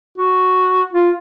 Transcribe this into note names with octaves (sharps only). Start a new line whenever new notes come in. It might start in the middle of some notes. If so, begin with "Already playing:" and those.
F#4
F4